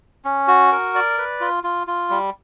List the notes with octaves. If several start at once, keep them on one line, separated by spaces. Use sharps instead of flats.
C#4
F#4
A#4
D5
B4
F4
F4
F4
G3